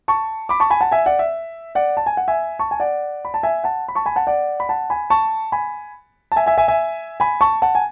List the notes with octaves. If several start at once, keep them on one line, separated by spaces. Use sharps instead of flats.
A5 C#6
B5 D6
A5 C#6
G#5 B5
F#5 A5
E5 G#5
D5 F#5
E5
D5 F#5
A5
G#5
F#5
E5 G#5
A5 C#6
G#5
D5 F#5
B5
A5
E5 G#5
F#5 A5
B5
A5 C#6
G#5 B5
F#5 A5
D5 F#5
B5
F#5 A5
G#5 B5
A5 C#6
G#5 B5
A5
E5 G#5
E5 G#5
E5 G#5
E5 G#5
G#5 B5
A5 C#6
F#5 A5
G#5